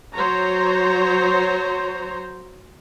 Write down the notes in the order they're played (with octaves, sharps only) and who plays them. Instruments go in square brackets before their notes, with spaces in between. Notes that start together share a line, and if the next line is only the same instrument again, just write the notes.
[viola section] F#3 C5 C#5 A#5